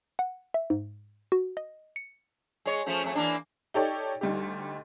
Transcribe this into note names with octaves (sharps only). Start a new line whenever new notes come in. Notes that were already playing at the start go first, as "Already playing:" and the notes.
F#5
E5
G#2
F#4
D#5
C#7
G#3 C#5
F3 A3 C#4
F2 A3
E3 A#3 D4
D#4 G4 A4 C#5 D5 G5
D2 G3 D#4 G4